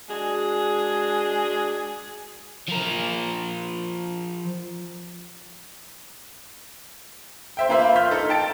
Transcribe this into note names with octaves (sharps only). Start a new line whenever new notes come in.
G#3 D4 F#4 G#4
F3 A#4
C5 E5 G5
A#3 F4 B4 C5 E5
C6 F6 G6 B6
D#4 A4
G5 A5 A6 D7